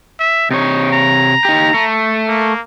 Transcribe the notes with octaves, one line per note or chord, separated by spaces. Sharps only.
E5
C3 D#4 C#5
A#5
D#4 G4
A3
A#3